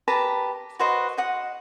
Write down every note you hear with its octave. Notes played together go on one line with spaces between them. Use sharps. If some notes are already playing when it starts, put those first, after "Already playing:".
G4 B4 A5 A#5
F#4 B4 C5 D#5
D#5 F#5 D#6